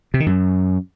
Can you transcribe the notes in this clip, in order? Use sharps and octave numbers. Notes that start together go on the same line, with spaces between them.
C3
D#3
F#2